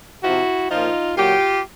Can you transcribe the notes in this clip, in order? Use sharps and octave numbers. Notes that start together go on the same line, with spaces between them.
C3 F3 E4 F#4
A#2 F3 D#4 F4
A#2 F#3 F4 G4